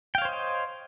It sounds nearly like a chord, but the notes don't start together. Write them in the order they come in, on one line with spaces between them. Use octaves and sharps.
G5 F5 C#5 C5 D#5